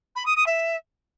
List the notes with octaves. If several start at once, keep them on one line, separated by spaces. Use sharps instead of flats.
B5
D#6
D#6
E5